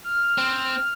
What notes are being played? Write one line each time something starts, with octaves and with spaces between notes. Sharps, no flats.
F6
C4